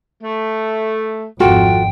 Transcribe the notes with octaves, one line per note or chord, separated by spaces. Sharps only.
A3
G#1 F2 F4 F#4 A4 G5